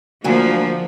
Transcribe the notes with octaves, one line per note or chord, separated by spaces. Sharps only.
D2 F3 F#3 A#3 G#5